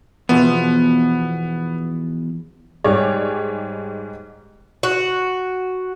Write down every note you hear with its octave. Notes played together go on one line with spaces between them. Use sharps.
E2 B2 F3 B3
G#2 G3 G#4 C#5 D5
F#4